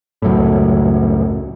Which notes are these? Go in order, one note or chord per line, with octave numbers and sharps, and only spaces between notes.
C#2 F#2 A2